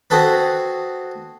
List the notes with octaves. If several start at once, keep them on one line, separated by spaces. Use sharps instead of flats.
C4 F#4 G#4 A4 B4